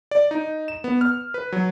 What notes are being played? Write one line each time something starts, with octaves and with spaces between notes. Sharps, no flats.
D5
D#4
E7
B3
F6
B4
F#3